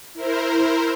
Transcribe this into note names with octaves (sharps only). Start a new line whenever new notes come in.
E4 A#4 C5